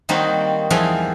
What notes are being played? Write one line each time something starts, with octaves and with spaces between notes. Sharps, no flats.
D#3 G3 A#3 C4 D#4 F#4
E2 E3 F3 G3 G#4 F5